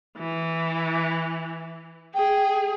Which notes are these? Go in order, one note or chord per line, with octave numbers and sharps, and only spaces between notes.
E3
G#4 G5